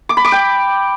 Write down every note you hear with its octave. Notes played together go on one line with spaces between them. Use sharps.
D6
B5
D6
G5